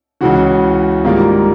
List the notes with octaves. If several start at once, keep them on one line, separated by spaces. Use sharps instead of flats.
C#2 C#3 E3 F#4
G#2 D#3 G3 A#3 F4